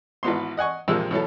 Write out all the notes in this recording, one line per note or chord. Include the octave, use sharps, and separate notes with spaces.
G#1 E3 B3 C6
D#5 F#5 G#5 C#6
A#1 F2 C3 G#3 A#4 E6
B2 E3 F#3 A4